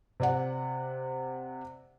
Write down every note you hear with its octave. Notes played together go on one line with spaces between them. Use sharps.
C3 D5 F#5